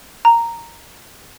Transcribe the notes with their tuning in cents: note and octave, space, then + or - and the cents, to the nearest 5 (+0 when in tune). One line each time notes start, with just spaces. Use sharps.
A#5 -5